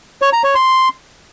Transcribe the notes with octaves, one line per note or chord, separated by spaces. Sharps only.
C#5
A#5
C#5
C6